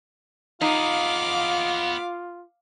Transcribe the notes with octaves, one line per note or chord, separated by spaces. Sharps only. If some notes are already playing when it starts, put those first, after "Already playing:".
B3 D#4 F4 G#4 F5 D6